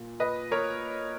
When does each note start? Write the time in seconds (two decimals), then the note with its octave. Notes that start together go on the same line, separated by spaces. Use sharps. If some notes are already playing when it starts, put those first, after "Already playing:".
Already playing: A#2
0.20 B4 D#5
0.51 A#4 C#5